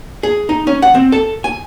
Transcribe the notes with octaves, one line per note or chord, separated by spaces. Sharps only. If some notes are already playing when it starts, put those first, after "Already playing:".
G#4
D#4
C#4
F#5
C4
A4
G#5